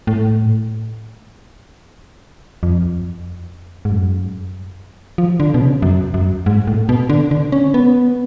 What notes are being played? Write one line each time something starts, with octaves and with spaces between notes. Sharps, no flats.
A2
F2
G#2
F#2
F3
D3
B2
C#3
F#2
F#2
G#2
A2
B2
D3
D3
C#4
B3